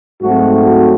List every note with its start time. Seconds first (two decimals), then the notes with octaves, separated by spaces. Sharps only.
0.22 G#2 F#3 A3 C4 F#4
0.65 F#4